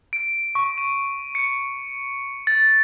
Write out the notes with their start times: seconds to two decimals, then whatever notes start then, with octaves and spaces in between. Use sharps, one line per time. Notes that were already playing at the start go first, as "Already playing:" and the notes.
0.13 D7
0.55 C#6
0.78 D#7
1.35 C#7
2.47 A6